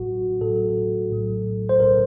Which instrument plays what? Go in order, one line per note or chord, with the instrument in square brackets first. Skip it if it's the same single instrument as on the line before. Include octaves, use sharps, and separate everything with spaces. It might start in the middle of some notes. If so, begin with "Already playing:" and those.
Already playing: [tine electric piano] A1 A2 F#3 F#4
A1 A2 F#3 A4
A#1 A2 F#3
C5
A#1 A2 F#3 A#4